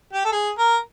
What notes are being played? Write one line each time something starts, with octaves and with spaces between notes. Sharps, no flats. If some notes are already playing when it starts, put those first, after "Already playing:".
G4
A4
G#4
A#4